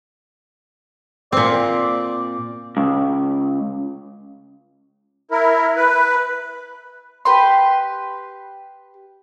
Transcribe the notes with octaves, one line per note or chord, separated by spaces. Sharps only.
A#2 C4 D5
C#2
E4 A#4
B4
G4 B4 C6